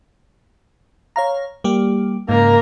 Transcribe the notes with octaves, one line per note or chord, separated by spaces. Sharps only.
C#5 F5 A#5
G3 A#3 G4
G#2 C#3 A#3 A#4